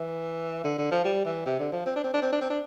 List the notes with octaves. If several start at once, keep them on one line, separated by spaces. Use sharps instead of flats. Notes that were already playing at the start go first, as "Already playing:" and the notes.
Already playing: E3
D3
D3
F3
G3
E3
C3
D3
F3
C4
D4
C4
D4
C4
D4
C4
D4